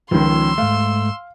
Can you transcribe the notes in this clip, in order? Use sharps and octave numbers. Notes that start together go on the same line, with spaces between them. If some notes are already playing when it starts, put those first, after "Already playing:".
C#2 D#3 F3 C#4 C6 E6
G#2 A3 F5